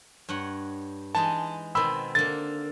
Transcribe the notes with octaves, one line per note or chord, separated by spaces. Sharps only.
G2 C#5 F#5
E3 G#3 D#4 A5
B2 D#3 C4 B5 E6
D3 A#3 A6